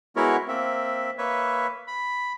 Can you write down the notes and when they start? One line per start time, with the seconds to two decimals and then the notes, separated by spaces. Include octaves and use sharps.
0.16 G#3 B3 E4 F#4 A#4 C#5
0.48 A#3 C4 E5
1.18 A#3 B4 C#5 E5
1.87 B5